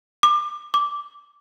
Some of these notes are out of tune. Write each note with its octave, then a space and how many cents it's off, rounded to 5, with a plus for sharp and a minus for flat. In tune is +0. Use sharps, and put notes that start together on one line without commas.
D6 +25
D6 -10